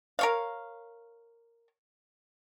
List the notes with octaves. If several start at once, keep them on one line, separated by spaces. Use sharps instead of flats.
A#4 C#5 F5